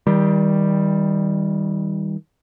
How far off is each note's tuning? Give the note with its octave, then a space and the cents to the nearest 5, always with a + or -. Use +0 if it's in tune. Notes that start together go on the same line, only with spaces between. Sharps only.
D#3 +35 G3 +5